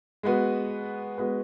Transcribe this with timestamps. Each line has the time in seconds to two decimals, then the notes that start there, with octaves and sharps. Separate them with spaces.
0.23 G#3 B3 F#4 B4
1.18 G#3 B3 F#4 B4